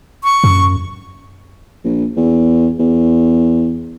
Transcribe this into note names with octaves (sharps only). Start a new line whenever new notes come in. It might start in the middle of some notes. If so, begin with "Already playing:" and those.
C#6
F#2
A#1
E2
E2